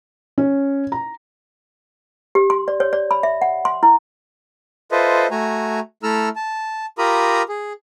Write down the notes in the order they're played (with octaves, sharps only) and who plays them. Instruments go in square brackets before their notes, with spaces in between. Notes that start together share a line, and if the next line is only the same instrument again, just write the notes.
[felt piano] C#4
A#5
[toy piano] G4
C6
D5
C#5
D5
B5
E5
F#5
C6
E4
[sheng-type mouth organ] F4 A4 B4 C5 D#5 E5
A3 F#4 G#5 A#5
A3 E4 A4 A#5 E6 F6
A5
F4 G4 A#4 A#5 B5 D#6
G#4